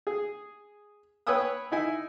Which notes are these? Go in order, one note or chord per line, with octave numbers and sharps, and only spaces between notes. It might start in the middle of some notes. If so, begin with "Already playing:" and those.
G#4
B4 C#5 G5 G#5 D#6 E6
D#4 E4 G#5